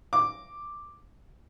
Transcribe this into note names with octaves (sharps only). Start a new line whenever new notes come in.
D6